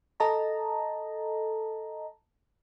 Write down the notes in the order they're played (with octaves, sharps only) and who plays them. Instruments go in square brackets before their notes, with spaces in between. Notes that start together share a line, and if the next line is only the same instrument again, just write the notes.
[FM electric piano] A4 D#5 A5 A#5